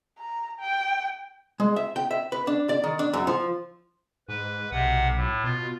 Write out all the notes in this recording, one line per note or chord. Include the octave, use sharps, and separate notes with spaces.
A#5
G5
G#3
E5
G5
E5
B4
D4
D5
D#3
D4
F#2
F3
G#2 B4
B1 C3 F#5
A2
B2 F4